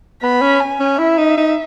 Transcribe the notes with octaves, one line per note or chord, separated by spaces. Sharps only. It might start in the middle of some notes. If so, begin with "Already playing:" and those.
B3 B5
C#4
G#5
C#4
E4 E5
D#4
D#4